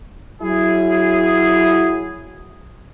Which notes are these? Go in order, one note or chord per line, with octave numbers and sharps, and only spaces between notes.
F#3 E4 G#4